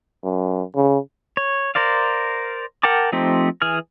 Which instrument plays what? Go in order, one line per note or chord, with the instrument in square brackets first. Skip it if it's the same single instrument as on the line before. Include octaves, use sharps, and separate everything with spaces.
[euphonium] F#2
C#3
[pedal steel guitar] C#5
A#4 C5 D5 F5
A#4 F#5 G5 A5 D6
F3 A3 C4 D#4 G4
E3 G#4 F6